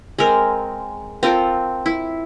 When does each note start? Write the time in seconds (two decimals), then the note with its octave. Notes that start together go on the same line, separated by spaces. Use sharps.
0.18 G#3 C4 A#4
1.23 C4 F4 A4 A#4
1.86 E4